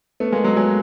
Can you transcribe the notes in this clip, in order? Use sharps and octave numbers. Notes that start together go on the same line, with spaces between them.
A3 B3
G#3 A#3
F#3 G#3
F#3 G#3